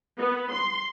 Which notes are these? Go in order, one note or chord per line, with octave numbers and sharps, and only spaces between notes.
B3
C6